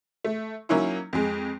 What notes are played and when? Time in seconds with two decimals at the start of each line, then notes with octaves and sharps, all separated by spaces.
0.24 A3
0.69 F#3 A#3 C#4 D#4 E4
1.13 F2 G#3